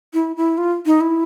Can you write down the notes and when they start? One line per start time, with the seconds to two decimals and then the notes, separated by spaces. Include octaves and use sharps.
0.14 E4
0.36 E4
0.58 F4
0.86 D#4
1.01 E4